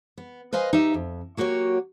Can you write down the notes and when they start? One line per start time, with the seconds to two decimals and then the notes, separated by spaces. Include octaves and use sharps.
0.17 B3
0.53 B4 C5 D#5 F5 G#5
0.73 D#4 G4 E5
0.94 F2
1.37 F#3 A#3 F#4 G4 C#5